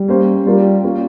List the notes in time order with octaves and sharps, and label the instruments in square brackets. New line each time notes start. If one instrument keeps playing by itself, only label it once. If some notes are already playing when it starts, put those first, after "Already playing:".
Already playing: [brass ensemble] G3
[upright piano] A#3 C#4 G4 C5
[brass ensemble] G3 [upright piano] A#3 F4 A#4
[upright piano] A#3 C#4 F4